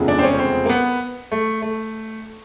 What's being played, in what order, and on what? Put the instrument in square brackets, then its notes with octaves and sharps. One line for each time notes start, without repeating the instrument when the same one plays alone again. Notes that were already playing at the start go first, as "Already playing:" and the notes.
Already playing: [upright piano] F1 E2 C#3 F3 G#3
[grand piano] D4
C4
C#4
C4
A#3
B3
A3
A3